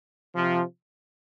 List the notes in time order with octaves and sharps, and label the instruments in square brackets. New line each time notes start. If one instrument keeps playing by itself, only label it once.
[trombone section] C3 F3